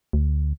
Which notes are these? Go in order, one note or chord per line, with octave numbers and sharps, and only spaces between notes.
D2